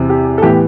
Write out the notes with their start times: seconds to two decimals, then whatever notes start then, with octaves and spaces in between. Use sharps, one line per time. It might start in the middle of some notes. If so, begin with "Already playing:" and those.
Already playing: E2 C3 E3
0.10 G4
0.38 A4
0.42 A2 E3 B3 G4